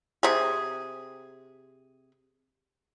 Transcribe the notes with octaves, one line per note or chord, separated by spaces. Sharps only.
C3 G#4